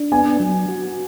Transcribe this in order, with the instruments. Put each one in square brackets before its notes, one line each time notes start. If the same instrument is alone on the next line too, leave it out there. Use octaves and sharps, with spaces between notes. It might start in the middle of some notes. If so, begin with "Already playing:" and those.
Already playing: [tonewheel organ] D4
[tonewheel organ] B3 [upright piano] G#5
[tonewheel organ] F#3
F#4